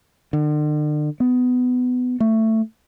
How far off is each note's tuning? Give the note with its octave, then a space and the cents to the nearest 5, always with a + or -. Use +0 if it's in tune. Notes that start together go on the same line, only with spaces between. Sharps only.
D3 +40
B3 +20
A3 +15